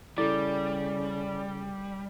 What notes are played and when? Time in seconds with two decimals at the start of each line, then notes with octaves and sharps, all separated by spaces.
0.18 C#3 G3 E4 A4 D5